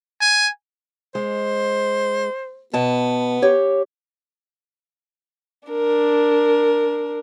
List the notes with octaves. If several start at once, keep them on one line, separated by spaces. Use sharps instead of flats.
G#5
G#3 C5
B2 B3 A5
G4 C#5
D4 A#4